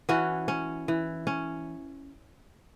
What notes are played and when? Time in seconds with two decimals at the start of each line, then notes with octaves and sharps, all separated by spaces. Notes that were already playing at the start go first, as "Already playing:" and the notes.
0.09 E3 C#4 F#4
0.48 C#4
0.88 E3
1.27 C#4